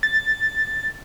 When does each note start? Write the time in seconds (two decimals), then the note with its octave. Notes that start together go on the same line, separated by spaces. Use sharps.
0.03 A6